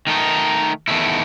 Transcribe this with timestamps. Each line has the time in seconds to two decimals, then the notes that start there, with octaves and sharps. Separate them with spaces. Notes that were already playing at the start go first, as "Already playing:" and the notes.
0.07 D#3 A3 D#4
0.88 E2 D#3 A3 E4